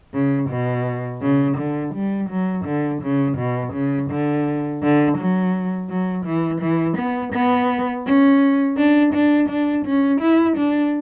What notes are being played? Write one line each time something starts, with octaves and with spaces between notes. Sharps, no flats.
C#3
B2
C#3
D3
G3
F#3
D3
C#3
B2
C#3
D3
D3
F#3
F#3
E3
E3
B3
B3
C#4
D4
D4
D4
C#4
E4
D4